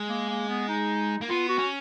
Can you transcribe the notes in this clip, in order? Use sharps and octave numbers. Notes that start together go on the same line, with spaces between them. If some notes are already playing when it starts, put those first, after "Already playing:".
Already playing: G#3
A#3
A#3
B3
D#4
A#3
B3 F4
F#4
C#4